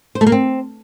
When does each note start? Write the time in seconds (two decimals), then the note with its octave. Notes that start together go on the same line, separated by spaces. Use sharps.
0.15 C5
0.21 A3
0.27 A#3
0.32 C4